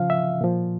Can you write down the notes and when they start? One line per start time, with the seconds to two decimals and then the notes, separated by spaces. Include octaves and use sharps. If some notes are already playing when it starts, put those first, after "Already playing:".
Already playing: C#3 F3 F5
0.10 E5
0.41 A#2 F3